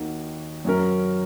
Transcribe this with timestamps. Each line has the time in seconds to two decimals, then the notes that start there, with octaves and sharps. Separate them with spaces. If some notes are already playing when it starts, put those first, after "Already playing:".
Already playing: D#2 D#3 A#3 D#4 F#4
0.64 F#2 F#3 C#4 A#4